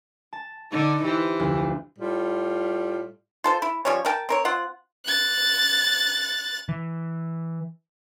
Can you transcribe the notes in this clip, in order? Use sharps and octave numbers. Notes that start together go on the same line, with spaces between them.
A5
D3 D#4
E3 G4 C5
F1 D2
A2 G3 F4
F4 A4 C5
E4
F3 G3 C#4 C#5
A3 A#4 G5 A5
C4 A#4 C#5
C4 F4 F#5
F#6 A6
E3